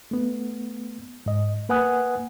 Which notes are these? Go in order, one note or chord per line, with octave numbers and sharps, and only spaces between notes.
A3 B3
G#2 D#5
A#3 B4 F#5 G#5 D#6 F#6